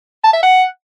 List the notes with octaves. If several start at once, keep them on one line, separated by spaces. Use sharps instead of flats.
A5
E5
F#5